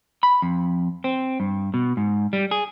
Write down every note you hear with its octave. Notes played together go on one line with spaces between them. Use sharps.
B5
F2
C4
G2
B2
G#2
G3
G#4